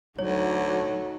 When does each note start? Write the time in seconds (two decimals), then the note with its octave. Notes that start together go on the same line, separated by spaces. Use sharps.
0.19 D2 F#3 D#4 C#5